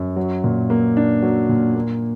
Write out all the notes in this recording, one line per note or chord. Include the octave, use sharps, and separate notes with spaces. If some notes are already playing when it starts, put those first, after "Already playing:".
Already playing: F#2
F#3
A#2
A#3
D4
F#3
A#2
A#3